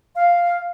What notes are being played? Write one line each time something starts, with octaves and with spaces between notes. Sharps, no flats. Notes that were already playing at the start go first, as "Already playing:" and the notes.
F5